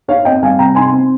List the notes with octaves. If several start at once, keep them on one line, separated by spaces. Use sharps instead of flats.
D#4 C#5 F5
C4 D#5 G5
G3 F5 G#5
C3 G5 A#5
D#4 G#5 C6
C4